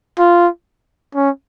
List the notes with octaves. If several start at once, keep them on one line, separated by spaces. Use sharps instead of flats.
F4
C#4